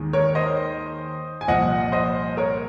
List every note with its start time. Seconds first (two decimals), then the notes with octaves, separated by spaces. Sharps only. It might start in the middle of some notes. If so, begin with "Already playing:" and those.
Already playing: D#2 D#3 G#3
0.13 A#4 C#5
0.35 C5 D#5
1.41 G#5
1.48 C2 A#2 F3 D#5 F#5
1.92 C5 D#5
2.37 A#4 C#5